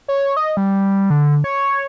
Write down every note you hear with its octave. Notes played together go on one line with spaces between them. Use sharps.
C#5
D#5
G3
D3
C#5